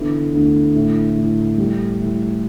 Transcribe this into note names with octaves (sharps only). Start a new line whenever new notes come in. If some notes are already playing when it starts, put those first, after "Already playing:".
Already playing: D3 E3 B3
D2
A2
A2
G3
A2